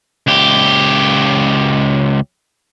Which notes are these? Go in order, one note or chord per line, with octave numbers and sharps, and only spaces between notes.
C#2 G4